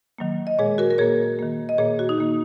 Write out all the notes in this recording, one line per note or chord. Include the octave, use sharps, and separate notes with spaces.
D#3 F#3 A#3
D#5
A#2 G#3 G#4 C#5
F#4 A#4
A#4
A#2 A#3 G#4 C#5
D#3 A#3
D#5
A#2 A#3 G#4 C#5
F#4
D#4
D#3 A#3